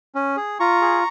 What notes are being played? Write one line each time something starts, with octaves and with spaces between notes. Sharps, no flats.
C#4
G#4
F4 A#5 C#6
G#4